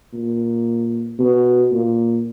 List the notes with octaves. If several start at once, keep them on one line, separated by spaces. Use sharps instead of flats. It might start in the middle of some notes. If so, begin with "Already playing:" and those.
A#2
B2
A#2